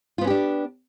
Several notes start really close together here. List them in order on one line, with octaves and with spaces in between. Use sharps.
F4 B3 C#4 G4 D4